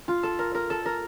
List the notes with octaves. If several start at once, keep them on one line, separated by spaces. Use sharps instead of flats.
F4
A4
A#4
A#4
A4
A#4